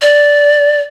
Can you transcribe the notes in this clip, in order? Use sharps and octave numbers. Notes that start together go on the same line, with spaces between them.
D5